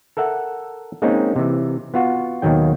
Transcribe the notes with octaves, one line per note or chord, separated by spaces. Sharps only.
A4 A#4 E5 F#5
G#3 A#3 C4 C#4 D#4
C3 E3
B3 F4 F#4
D#2 B2 D#3 F#3 G5